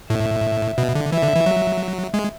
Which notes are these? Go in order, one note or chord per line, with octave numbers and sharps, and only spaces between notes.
A2 E5
B2
D3
E3 E5
D3
E3
F#3
G#3